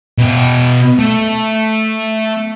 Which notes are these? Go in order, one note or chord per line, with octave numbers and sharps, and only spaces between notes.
B2 G5
A3